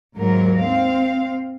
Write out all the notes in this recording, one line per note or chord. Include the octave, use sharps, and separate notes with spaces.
D#2 G#2 F#3 A#4
C4 F5